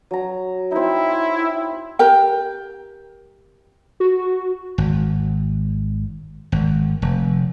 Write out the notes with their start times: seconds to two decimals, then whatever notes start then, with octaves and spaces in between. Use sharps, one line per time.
0.11 F#3 A#5
0.72 C4 D#4 E4
1.99 G4 A#4 G5
4.00 F#4
4.78 G#1
6.52 G#1
7.02 F1